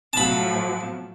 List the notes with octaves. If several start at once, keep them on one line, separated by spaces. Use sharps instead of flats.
A2 F3 F#3 A5 B5